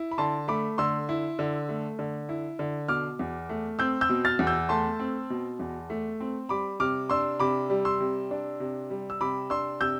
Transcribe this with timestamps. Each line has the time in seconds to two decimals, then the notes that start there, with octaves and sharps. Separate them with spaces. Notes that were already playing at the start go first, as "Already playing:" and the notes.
Already playing: E4
0.11 B5
0.18 D3 A5 C6
0.48 A3 B5 D6
0.78 D3 C6 E6
1.09 E4
1.39 D3
1.69 A3
1.99 D3
2.29 E4
2.59 D3
2.88 B2 D6 F6
3.19 E2
3.49 A3
3.79 C4 E6 G6
4.01 E6 G6
4.09 B2
4.25 F6 A6
4.39 E2
4.47 E6 G6
4.69 A3 A5 C6
4.99 C4
5.30 B2
5.59 E2
5.90 A3
6.20 C4
6.49 G3 B5 D6
6.80 C3 D6 F6
7.09 D4 C6 E6
7.40 C3 B5 D6
7.70 G3
7.85 C6 E6
8.00 C3
8.31 D4
8.60 C3
8.90 G3
9.10 E6
9.21 C3 B5 D6
9.50 D4 C6 E6
9.81 C3 E6 G6